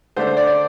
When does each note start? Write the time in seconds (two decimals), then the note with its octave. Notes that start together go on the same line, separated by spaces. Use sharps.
0.16 D3 A3 D4 C5
0.27 C5
0.37 D5
0.47 D5